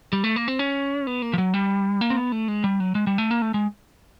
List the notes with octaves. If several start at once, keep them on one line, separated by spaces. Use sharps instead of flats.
G3
A3
A#3
C4
C#4
B3
A#3
F3
F#3
G3
A#3
C4
B3
A3
G#3
G3
F#3
G#3
G3
A3
A#3
A3
G#3